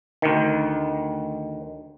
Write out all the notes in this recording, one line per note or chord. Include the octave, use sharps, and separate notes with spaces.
D2 D#3